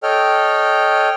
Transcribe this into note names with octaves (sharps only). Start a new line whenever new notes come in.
A4 C#5 D#5 G5 F6